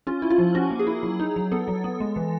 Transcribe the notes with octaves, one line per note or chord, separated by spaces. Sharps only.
C#4 F4
E4
F4
F3
C#4 F#4
A#3
G#4
E4
F#3
D#4
F#3
B3 A4
F#3
B3
G#3
E3